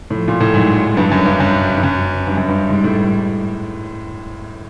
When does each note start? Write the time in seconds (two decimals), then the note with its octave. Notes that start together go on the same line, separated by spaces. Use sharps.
0.10 A2 F3
0.28 A#2
0.40 A2
0.53 G#2 F#3
0.97 G2 F#3
1.11 F#2
1.26 G2
1.40 F#2
1.77 G2
1.83 F#2
2.27 G2 G3
2.37 F#2
2.48 G2
2.70 G#2 G3
2.84 A2